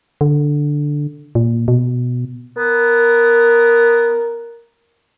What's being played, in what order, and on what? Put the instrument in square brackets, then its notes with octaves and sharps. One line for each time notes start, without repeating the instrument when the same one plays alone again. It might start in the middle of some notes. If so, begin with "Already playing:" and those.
[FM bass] D3
A#2
B2
[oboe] B3 [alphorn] A#4